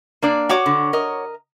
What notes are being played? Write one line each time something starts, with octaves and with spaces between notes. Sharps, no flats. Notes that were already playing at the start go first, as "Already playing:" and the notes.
A#3 D4 D5
F#4 C#5 D6
D3
A#4 D#5